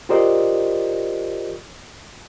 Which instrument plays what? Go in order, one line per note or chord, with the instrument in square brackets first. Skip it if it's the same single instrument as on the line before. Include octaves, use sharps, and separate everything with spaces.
[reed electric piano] F4 G4 A#4 C5 D5 D#5